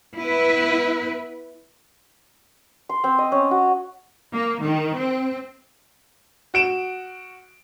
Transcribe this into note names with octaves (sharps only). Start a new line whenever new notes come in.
B3 E4 B4
C6
C4
D#5
C#4
F#4
A#3
D#3
C4
F#4 D7 E7